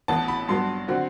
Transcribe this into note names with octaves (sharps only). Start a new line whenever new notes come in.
A1 A2 E3 B3 A5
B5
G2 F#3 B3 C6
D3 F#3 C4 F#4